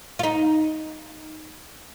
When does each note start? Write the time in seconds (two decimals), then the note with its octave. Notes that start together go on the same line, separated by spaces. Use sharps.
0.19 F4
0.23 D#4